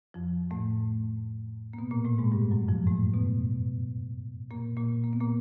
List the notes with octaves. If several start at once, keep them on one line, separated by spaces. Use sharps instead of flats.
F2 F3
A2 A3
A#3
B2 B3
A#2 A#3
A2 A3
G#2 G#3
G2 G3
F#2 F#3
F2 F3
A2 A3
B2 B3
A#2 A#3
A#2 A#3
A#3
B3
A#2 A#3